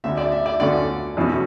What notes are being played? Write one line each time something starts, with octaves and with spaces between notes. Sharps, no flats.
D2 D3 A3 C#4 E5
D5
E5
D5
D2 D3 A3 C#4 D5
E2 B2 A3 C#4